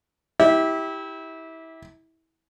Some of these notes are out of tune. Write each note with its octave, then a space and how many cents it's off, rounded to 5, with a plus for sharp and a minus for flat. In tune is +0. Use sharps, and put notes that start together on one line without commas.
E4 -25 G4 +0